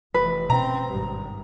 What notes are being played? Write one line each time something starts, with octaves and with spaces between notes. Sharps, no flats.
F1 E3 B4
B2 C4 C#4 A#5
G#1 G2